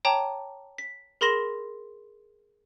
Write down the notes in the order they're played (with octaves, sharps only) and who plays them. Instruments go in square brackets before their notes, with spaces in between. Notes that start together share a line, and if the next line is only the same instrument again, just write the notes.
[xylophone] C#5 G5 A5 A#5 D6
B6
G#4 A#4 B5 C6 A#6 E7